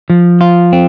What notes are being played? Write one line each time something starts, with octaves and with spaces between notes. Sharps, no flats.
F3
F4
C4